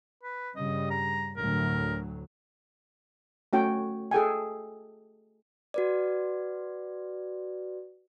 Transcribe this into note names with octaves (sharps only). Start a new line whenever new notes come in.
B4
G2 C#3 G3 D#5
A#5
D2 A2 F#3 A#4
A3 C#4 F#4 C#5 G5
G#4 A4 G5 G#5
F#4 B4 D5